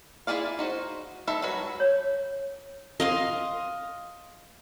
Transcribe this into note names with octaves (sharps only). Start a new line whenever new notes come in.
E4 F#4 G#4 D5 F5
D#4 F#4 C5
D#3 A4 E5 B5
F#3 G#3 F#4 B4
C#5
D#5 F5 C6